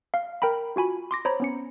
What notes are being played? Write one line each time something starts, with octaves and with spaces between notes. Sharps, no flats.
F5
A#4 G5 A#5 B5
F4 F#4 G#5 B5
C6 D6 A#6
C5 C#5 A#5 B5
B3 C#4 C#7